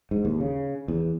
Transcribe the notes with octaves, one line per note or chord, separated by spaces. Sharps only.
G#2
D#2
C#3
E2